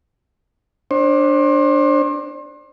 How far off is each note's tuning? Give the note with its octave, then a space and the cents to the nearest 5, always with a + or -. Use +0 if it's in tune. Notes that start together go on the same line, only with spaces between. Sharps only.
D4 +0 C5 +35